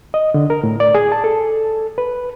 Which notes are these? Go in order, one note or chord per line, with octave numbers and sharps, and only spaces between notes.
D#5
D3
A#4
A2
D5
G#4
A5
A4
B4